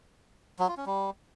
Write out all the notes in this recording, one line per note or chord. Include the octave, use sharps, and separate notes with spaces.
F#3
F4
C#4
G3